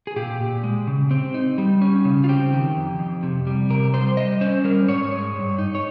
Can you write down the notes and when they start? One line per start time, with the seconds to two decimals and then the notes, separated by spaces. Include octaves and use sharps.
0.07 G#4
0.16 A#2 G4
0.40 A#2
0.64 G#3
0.87 C#3
1.11 C4
1.34 D#4
1.58 G3
1.82 C#4
2.05 C#3
2.24 F4
2.29 C4 G4
2.52 D#3
2.76 F2
2.99 F2
3.23 C3
3.47 G3
3.70 C3 A#4
3.93 G3 C5
4.17 G3 D#5
4.41 C#4 C5
4.64 G3 A#4
4.88 G#2 C#5
5.12 G#3
5.35 G2
5.58 D#4
5.75 C#5